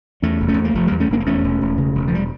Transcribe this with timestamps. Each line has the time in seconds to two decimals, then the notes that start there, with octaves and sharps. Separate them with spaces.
0.22 E2 A3 C#4
0.40 F1
0.48 A3 C#4
0.57 E2
0.65 A#3
0.74 F1 F3 A3
0.87 E2 G3 A#3
1.00 A3 C#4
1.10 F1 A#3 D4
1.20 A#3
1.26 E2 A3 C#4
1.44 E1
1.61 E1
1.77 C#3
1.95 E1
2.08 F3
2.15 G3